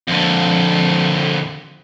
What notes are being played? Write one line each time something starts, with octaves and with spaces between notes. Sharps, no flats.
F2 D3